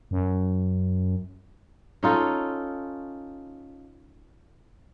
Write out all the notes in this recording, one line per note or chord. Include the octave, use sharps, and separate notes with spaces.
F#2
C#4 D#4 F4 A4